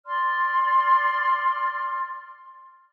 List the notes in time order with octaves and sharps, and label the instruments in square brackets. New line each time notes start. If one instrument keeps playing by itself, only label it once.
[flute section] D5 C6 F6